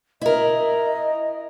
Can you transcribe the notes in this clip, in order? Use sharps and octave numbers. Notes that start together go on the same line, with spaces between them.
E4 A#4 D#5